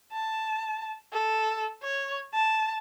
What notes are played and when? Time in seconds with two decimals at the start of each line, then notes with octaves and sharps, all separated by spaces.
0.12 A5
1.13 A4
1.83 C#5
2.34 A5